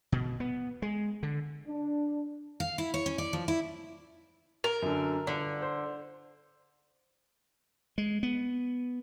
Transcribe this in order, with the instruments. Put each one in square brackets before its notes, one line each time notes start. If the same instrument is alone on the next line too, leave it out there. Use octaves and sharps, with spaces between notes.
[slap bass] B2
B3
G#3
D3
[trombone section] D4
[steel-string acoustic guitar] F5
E4
C#5
C#4
D5
F3
E4
[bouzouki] A#4
[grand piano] F#2 D3
[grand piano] G1 [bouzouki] D3
[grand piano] C5
[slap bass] G#3
B3